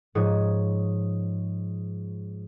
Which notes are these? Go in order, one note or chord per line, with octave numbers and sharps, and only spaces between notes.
G#2 F3 C#5 D#6